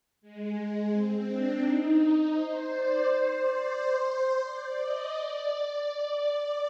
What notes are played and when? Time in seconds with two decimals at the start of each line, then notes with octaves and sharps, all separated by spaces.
0.21 G#3
0.56 G#3
0.91 C4
1.26 D4
1.62 D#4
2.33 C5
2.68 D5
3.03 C5
3.39 D5
3.74 C5
4.45 D5
4.80 D#5
5.15 D5
5.86 D5
6.21 D5